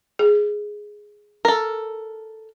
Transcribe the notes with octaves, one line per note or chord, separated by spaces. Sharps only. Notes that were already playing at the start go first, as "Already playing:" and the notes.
G#4
A4 A#4